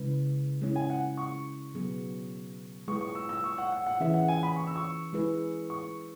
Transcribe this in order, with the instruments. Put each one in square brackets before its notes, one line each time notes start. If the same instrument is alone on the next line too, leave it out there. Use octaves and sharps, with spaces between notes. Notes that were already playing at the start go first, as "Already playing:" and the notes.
Already playing: [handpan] C#3 G#3 E4 B4
G#3 C#4 E4
[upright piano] G#5
F#5
C#6
[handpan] B2 F#3 B3 G#4
[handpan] G#3 E4 G#4 B4 [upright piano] C#6
[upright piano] C#6
E6
E6
C#6
F#5
F#5
F#5
[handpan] E3 C#4 G#4 B4 [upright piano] E5
[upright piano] F#5
G#5
B5
C#6
E6
C#6
[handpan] G#3 E4 G#4 B4
[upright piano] C#6